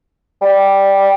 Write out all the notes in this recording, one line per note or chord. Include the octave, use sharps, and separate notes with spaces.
G3